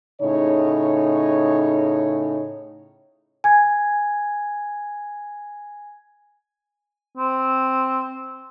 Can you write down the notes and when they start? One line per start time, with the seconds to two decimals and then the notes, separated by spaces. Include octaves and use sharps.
0.21 A2 C#3 D#4 C#5
3.44 G#5 G#6
7.17 C4